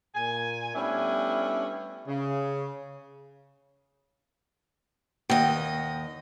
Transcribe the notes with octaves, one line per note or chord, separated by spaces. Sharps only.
A#2 G#5
G3 A3 B3 C#4 D4 E4
C#3
D#2 D#5 F#5 G5